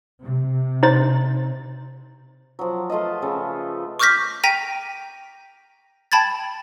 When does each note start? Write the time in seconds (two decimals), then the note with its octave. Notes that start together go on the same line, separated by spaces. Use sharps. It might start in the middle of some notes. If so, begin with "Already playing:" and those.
0.23 C3
0.83 D#4 C5 A6
2.59 F3 F#3
2.90 A3 F4 B4 D#5
3.22 C#3 A3
3.99 C#6 D6 F6 G6 A#6 B6
4.44 G5 A#5 A#6 B6 D#7
6.12 G5 A5 B5 G#6 A6